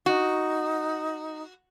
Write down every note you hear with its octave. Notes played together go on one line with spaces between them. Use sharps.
D#4 F#4